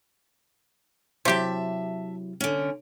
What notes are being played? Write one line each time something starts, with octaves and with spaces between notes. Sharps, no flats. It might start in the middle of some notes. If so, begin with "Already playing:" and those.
C3 F#3 E4 G4 E5 A5
D3 C#4